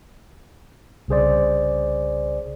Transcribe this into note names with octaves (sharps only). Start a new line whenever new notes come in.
C2 C#3 G#4 C5 D5